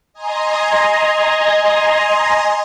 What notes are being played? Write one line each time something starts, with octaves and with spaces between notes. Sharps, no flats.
D#5 G#5 A#5 C6